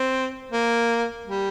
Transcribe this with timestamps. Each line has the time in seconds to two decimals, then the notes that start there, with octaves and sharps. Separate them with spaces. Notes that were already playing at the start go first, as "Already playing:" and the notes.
Already playing: C4
0.52 A#3
1.27 G3